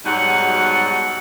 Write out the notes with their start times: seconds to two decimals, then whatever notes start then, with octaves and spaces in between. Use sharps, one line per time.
0.05 G#2 B2 F#3 G3 D#4 F#5